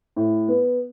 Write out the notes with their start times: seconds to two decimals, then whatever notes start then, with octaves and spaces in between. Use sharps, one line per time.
0.16 A2
0.48 B3